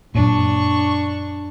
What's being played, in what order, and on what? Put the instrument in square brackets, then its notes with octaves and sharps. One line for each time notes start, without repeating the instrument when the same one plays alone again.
[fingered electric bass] F#2 A#2 [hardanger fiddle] D4 C#6